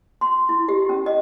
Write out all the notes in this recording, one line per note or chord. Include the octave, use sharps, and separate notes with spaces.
C6
E4
G4
C#4
D#5